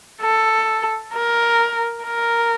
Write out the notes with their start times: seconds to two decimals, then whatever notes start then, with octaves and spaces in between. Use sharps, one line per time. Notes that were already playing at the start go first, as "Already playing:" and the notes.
0.22 A4
1.13 A#4
2.05 A#4